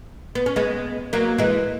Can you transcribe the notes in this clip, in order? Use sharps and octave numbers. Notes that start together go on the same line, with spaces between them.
B3
C#4
G#3 B3
F#3 A#3
E3 G#3